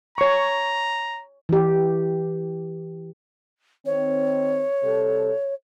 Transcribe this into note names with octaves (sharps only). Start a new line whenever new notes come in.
C#5 A#5 C#6
E3 G4
D#3 C4 C#5
C3 G3 A4